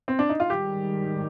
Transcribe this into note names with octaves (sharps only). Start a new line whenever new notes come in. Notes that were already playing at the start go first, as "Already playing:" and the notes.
C4
D4
D#4
F4
G#2 D#3 G3 G4